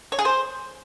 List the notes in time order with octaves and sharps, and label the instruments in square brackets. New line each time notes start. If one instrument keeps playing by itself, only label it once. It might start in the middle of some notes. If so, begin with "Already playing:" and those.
[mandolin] C#5
G#4
C5